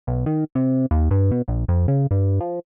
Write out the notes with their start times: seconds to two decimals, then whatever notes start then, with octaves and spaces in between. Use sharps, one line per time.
0.07 B1
0.26 D#3
0.55 C3
0.91 D#2
1.11 G2
1.31 B2
1.48 A#1
1.68 F2
1.88 C#3
2.11 G2
2.40 F3